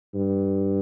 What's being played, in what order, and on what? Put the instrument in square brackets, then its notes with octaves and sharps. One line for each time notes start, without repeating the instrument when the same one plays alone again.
[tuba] G2